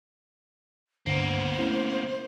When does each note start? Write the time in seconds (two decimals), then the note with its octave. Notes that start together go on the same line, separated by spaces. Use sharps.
1.06 C#2 G2 D3 A#3 B3 C5
1.59 A3 C#4 E4